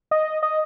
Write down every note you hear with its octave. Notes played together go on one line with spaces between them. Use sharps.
D#5
D#5